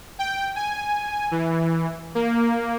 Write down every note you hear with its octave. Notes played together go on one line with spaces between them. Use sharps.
G5
G#5
E3
A#3